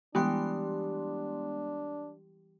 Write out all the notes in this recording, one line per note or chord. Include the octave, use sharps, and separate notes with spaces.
E3 G3 G#3 B3 D4 G4 G5 C6